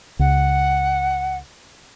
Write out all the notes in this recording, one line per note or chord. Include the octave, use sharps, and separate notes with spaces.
C#2 F#5